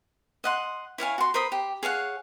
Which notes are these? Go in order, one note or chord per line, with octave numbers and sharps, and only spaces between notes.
D#5 F#5 C6
E4 C#5 F5 G#5
F#4 C6
A#4 C5 B5 D#6
G4
G#4 C#5 F5 F#5